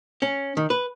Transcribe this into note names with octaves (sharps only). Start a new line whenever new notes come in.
C#4
D#3
B4